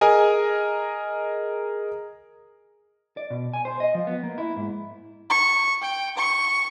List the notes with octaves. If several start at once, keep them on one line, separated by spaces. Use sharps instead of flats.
G#4 A#4 D#5 G#5
D5
B2
G#5
C5
D#5
F3
B3
A#3
E4
G#2
C#6
G5
C#6